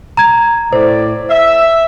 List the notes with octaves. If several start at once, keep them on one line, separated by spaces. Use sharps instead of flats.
A#5 G#6
A2 C5 D5
E5